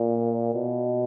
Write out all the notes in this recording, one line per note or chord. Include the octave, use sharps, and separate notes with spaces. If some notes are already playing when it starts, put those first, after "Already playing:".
Already playing: A#2
B2